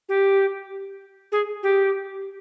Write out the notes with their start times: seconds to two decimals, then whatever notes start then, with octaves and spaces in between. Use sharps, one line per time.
0.09 G4
1.32 G#4
1.63 G4